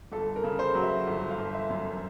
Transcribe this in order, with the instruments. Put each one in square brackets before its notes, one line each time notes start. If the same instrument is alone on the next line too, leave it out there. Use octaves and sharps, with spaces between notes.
[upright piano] G1 [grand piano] A4
[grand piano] A#4
[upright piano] C#3
[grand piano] C5
[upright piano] F#3
[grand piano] E5
[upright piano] G1
[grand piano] F5
[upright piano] G1
[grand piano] E5
[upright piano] F#2